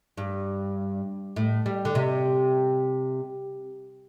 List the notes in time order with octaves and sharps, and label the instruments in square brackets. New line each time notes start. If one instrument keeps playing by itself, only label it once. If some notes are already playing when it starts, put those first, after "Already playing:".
[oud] G2
A2
G3
D3
C3